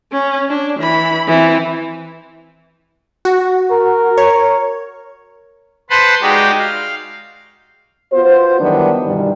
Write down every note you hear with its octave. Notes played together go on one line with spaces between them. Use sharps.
C#4
D4
E3 B5
E3 C4
F#4
A#4
C#5
B4 C5 F#5 A5 B5 C6
G#3 D#4 F#4 G4 D5 G5
F5
B3 F4 F#4 C5
D#3 E3 F#3 G3 B3 D4
G2 B2 D#3 E3 G3